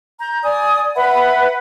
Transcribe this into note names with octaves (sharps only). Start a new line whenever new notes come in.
A#5 G6
D5 G#5 D#6
B4 E5 F#5 B5